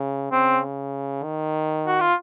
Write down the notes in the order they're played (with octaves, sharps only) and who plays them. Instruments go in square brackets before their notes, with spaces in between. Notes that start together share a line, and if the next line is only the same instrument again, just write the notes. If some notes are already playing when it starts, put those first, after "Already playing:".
Already playing: [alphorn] C#3
[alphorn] C#3 [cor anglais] C4
[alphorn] D#3
[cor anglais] F#4
F4